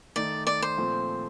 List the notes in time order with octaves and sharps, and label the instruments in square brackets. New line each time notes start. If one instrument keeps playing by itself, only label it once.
[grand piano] D#3 A3 D#4 [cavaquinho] D5
[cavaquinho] D5
C5
[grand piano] A#2 F3 A3 C4